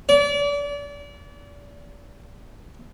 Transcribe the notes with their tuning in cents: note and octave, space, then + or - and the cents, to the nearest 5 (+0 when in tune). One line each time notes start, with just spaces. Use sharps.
D5 -35